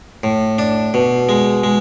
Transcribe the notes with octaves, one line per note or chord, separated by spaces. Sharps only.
A2
D4
B2
G#3
G#3